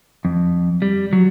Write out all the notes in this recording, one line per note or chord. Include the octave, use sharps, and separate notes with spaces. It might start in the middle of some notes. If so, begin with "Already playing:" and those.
F2
G3
F#3